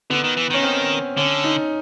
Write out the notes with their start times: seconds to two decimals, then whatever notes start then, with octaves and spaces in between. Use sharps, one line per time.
0.10 D3 B3
0.24 D#3
0.37 E3
0.50 D#3 C#4
0.63 C4
1.17 D3 C#4
1.44 D#4